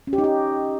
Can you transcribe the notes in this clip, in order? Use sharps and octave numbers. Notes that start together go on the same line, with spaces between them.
C#4
G4
D#4
G4